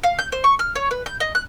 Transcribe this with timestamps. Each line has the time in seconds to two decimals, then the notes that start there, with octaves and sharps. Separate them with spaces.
0.03 F5
0.19 G6
0.32 C5
0.44 C#6
0.59 F6
0.75 C#5
0.91 B4
1.06 G6
1.20 D#5
1.35 F#6